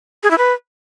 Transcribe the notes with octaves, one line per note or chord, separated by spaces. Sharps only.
G#4
E4
B4